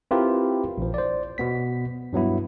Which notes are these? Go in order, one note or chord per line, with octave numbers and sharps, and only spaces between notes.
C4 E4 F4 G4 A#4 B4
A#1 F3
C5 D5
B2 B3 B6
G2 F#3 B3 E4